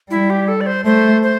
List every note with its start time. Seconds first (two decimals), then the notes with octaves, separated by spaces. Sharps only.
0.10 G3 E4
0.30 G4
0.48 A4
0.61 D5
0.66 C5
0.85 A3 C5
1.22 C5